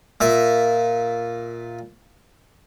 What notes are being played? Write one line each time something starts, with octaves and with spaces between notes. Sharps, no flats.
A#2 E5